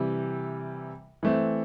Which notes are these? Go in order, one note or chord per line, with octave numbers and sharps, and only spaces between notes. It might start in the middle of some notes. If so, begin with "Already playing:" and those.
Already playing: C3 E3 G3
E3 A3 C4